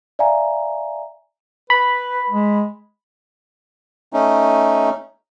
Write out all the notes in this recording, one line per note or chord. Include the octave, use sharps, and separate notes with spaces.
D5 E5 F5 G#5 A#5
B4 B5
G#3
A3 C#4 D#4